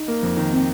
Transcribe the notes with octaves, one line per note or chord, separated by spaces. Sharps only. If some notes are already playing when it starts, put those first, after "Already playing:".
Already playing: D#4
A#3
F2
D#3
C4